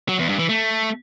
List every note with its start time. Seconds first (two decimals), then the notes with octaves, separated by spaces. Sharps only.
0.09 F#3
0.19 E2
0.29 G2
0.39 E3
0.49 A3